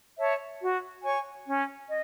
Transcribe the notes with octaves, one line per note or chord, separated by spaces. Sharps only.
C#5 E5 A5
F#4
C#5 G#5 C#6
C#4
D#5